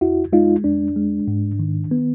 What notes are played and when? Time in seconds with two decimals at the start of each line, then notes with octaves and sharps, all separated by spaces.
0.01 F2 E4 F#4
0.33 G#3 D#4 F4
0.64 F2 D4
0.96 G#3
1.28 G#2
1.59 D#3
1.91 B3